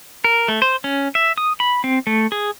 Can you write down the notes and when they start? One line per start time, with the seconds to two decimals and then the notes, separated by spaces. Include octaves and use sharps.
0.24 A#4
0.48 A3
0.62 C5
0.84 C#4
1.15 E5
1.38 D#6
1.60 B5
1.84 C4
2.07 A3
2.32 G#4